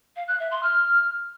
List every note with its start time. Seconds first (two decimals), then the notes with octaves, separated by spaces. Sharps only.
0.16 F5
0.28 F#6
0.40 E5
0.51 C6
0.63 F6